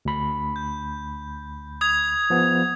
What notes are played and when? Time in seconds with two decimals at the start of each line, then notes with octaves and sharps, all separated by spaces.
0.05 D2 B5
0.56 G6
1.81 D#6 G#6 F7
2.30 F3 B3